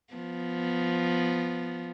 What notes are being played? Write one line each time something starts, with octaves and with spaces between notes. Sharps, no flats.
F3 B3